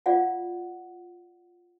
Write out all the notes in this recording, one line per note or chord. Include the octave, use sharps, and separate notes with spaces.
F4 D5 F5 F#5